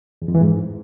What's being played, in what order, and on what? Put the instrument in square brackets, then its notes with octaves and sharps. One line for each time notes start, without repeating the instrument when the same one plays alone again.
[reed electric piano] E2
F2
E3
G#2